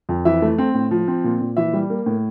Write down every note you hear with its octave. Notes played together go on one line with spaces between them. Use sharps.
F2
E3 E5
A3
C4
A2
F3
C4
A#2
A#2
E3 E5
G3
A#3
A2